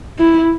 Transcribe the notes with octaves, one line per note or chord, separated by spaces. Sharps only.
E4